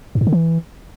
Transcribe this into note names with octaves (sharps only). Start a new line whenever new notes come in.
G2
G#2
D3
E3